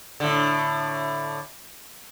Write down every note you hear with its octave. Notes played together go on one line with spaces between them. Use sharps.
A2 D3